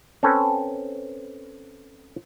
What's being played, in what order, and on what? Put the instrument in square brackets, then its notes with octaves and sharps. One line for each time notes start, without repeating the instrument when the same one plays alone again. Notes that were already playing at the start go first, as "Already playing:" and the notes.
[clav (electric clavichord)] C4 C#4 A4 B4